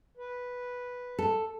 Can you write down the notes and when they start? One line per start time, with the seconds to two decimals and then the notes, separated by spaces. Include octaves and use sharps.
0.17 B4
1.19 A4